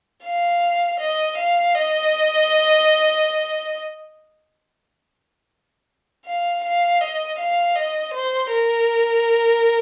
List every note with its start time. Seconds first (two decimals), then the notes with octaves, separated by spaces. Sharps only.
0.24 F5
1.00 D#5
1.37 F5
1.75 D#5
6.26 F5
6.64 F5
7.01 D#5
7.38 F5
7.75 D#5
8.13 C5
8.51 A#4